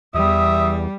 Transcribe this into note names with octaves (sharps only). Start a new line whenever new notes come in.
E2 G3 E5 D#6